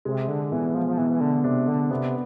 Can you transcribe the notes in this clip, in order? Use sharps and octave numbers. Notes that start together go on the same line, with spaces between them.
C3 G#3
D3
B2 E3
F3
F3
B2 E3
E3
D3
C3 D4
D3
C3 B3